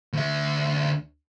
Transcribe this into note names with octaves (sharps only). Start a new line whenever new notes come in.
D2 E5